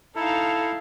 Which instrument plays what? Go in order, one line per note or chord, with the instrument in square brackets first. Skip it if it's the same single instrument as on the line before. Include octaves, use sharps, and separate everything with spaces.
[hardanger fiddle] D#4 F5 [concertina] E4 [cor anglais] A4